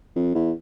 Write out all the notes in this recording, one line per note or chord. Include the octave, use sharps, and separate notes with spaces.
F2
E2